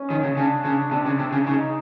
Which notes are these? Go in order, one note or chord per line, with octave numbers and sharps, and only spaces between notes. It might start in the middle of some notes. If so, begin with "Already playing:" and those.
Already playing: C#4
D#3
C#3
C#3 D4
C#3
C3 D4
C#3
C3
C#3
C#3 D#4